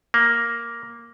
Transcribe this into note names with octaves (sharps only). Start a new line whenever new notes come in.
A#3